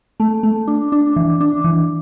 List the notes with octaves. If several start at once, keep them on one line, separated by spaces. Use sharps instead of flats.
A3
A3
D4
D4
E3
D4
E3